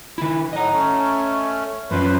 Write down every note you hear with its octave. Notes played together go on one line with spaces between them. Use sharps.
D#3 E4
A2 F#3 D#5 A#5
A3 C#4
F#2 F3 C#4 B4 C5